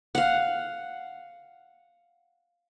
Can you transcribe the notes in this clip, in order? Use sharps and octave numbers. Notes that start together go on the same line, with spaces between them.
F5 F#5